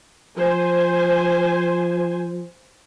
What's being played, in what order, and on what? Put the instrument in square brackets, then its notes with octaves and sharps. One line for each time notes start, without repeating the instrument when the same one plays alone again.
[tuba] F3 [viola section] C5 G#5